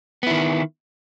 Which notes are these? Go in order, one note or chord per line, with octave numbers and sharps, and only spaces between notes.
D#3 B3 E4